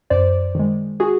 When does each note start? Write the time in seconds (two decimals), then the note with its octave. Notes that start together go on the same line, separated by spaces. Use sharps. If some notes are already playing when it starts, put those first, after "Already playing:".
0.10 F#2 C5 D5
0.55 D#3 G#3
1.00 F#4 G#4